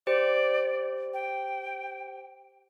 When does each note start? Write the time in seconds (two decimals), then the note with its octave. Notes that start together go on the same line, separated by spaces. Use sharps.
0.07 G4 C5 D5
1.14 G5